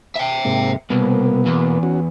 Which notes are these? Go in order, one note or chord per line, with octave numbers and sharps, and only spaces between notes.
E5 G5
G#2 C3 A#3
C2 B2 A#3 B3
E2
C#4 F#4